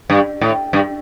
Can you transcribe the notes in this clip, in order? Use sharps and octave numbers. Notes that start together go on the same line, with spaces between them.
G2
A2
G2